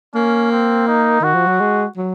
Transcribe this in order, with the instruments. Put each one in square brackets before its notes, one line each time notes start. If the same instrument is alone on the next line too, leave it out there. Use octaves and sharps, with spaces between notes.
[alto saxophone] A#3 [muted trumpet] C#4
[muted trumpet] C4
D#4
[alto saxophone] D#3 [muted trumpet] F#4
[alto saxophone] F3
F#3
G#3
F#3